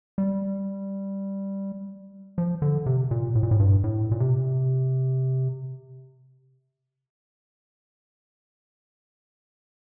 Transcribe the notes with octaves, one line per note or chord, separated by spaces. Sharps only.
G3
F3
D3
C3
A#2
A2
A#2
A2
G2
A2
A#2
C3